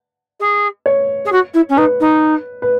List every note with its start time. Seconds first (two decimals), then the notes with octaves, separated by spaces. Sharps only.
0.40 G#4
0.86 C#5
1.25 G#4
1.32 F#4
1.54 E4
1.69 C#4
1.77 D#4 B4
2.00 D#4
2.62 B4